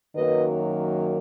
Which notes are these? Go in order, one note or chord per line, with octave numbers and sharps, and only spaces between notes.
F#2 D#3 F#3 A#3 B4 D#5